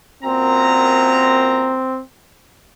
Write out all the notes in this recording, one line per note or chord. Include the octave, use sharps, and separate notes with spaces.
F#2 A#2 C4 A#5